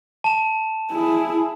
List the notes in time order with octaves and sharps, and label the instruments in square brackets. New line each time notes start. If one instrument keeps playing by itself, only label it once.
[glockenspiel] A5 E7
[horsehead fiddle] E4 G#4